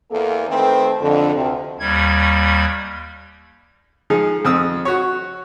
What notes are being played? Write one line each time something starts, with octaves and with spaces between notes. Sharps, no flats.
E2 A#3 A4
D#3 A3 C4 B4 C5
F2 D3
D2 C3
D#2 G3 G#6
F3 G#3 D#4 G#4
F2 C4 D#6 E6
F#4 C#5